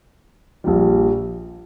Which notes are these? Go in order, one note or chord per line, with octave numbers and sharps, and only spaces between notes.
A#1 A#2 G3